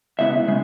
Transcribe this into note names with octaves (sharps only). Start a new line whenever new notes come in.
C#3 G#3 B3 E4 E5
C#3 G#3